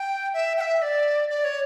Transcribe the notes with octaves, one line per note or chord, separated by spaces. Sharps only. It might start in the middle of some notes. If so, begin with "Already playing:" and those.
Already playing: G5
E5
G5
E5
D5
D5
C#5